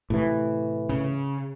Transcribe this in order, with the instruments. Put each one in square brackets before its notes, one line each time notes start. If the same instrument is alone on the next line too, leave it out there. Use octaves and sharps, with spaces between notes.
[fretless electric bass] A2 C3 E3
[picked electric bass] C#3